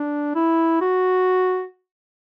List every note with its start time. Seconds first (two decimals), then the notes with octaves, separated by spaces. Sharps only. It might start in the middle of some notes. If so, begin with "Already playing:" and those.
Already playing: D4
0.35 E4
0.81 F#4